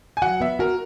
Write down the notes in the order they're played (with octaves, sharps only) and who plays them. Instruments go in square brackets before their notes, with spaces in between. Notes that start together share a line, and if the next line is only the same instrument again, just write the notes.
[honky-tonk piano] G#5
[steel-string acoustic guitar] F#3 [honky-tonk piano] F#5
[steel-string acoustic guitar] B3 [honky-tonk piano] E5
[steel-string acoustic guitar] F#4 [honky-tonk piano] A#4